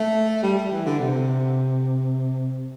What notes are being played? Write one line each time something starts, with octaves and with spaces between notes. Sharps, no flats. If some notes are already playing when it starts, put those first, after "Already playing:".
Already playing: A3
G3
G3
E3
D3
C3